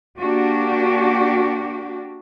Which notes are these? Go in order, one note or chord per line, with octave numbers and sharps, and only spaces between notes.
A#3 D4 F#4 G4